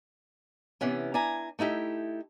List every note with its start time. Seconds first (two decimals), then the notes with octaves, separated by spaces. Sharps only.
0.81 C3 E3 B3 C#4
1.14 D4 E4 G#5 A#5
1.59 A3 D#4 E4 G4 A4